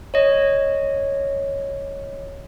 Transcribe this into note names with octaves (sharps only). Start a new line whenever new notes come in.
C#5 D#5